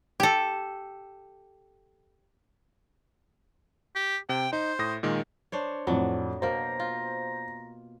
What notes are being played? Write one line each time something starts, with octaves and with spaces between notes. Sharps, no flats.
G4 A4
G4
C3 G5
D#4 C5
A2 D#6 A#6
A#2 D#3 G#3
D4 C5 C#5
F2 A2 F#3 D4
B2 A#3 C5 A#5
F4